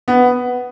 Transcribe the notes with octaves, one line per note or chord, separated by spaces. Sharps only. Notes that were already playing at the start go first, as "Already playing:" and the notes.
B3